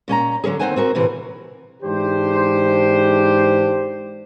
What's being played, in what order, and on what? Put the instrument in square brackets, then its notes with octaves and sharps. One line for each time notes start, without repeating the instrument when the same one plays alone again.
[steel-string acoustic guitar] A#2 C#4 G#5 A#5
D3 F#3 C#4 G#4
D#2 F#3 C4 C5 F#5 G#5
C4 F#4 A#4
A2 C3 E3
[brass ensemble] G#2 E3 D4 G4 C5